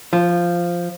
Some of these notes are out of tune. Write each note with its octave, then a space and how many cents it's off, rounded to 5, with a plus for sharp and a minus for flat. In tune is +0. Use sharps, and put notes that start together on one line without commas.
F3 -5